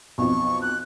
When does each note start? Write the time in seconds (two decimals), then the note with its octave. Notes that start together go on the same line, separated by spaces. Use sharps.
0.18 B1 F2 C#6
0.62 F#6